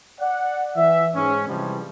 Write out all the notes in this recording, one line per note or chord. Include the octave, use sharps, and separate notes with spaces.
D5 F#5
E3 E5
G#2 C#4
C3 E3 F3 G3 G#3